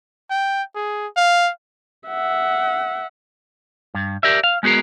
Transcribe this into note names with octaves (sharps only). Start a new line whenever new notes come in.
G5
G#4
F5
E5 F#5
G2
G4 A#4 D5 E5
F5
G#3 B3 F#4 G#4 A#4